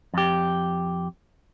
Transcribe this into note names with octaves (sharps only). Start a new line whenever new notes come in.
F2 G4